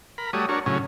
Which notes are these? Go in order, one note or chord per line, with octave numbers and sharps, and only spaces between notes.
A#4 B5
G3 A3 F#4 C#5 D#6
D4 F#4 A#4 C#5
A2 C#3 F#3 C#4